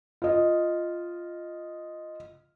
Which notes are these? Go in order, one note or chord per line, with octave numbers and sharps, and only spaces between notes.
F4 D#5